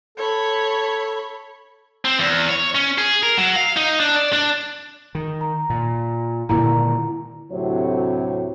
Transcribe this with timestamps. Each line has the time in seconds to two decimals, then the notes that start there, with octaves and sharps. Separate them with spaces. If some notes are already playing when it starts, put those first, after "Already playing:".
0.18 A4 C#5 B5
2.05 C4
2.20 E2
2.49 C#5
2.75 C#4
2.98 G#4
3.23 A#4
3.38 F#3
3.56 F5
3.77 D#4
4.00 D4
4.16 D5
4.33 D4
5.15 D#3
5.41 A#5
5.70 A#2
6.49 A#2 D3 D#3 E4 A#5
7.51 D2 A2 C3 F#3 C4 C#5